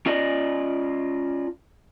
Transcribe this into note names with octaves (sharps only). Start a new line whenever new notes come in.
C#4 F4 D5 D#5